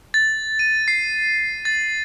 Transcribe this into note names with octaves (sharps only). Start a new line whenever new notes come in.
A6
D#7
C7
A6